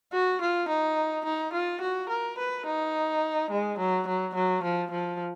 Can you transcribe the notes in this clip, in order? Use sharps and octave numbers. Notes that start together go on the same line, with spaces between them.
F#4
F4
D#4
D#4
F4
F#4
A#4
B4
D#4
G#3
F#3
F#3
F#3
F3
F3